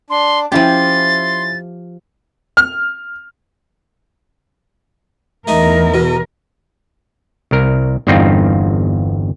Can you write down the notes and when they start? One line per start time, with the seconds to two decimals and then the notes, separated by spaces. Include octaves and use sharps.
0.10 D4 C6
0.52 F3 C#4 E4 G4 C6 A6
2.57 F6
5.47 E2 E3 A3 D#4 A#4
5.94 B2
7.51 C2 A#4
8.07 G1 E2 G2 C4 D#4 F4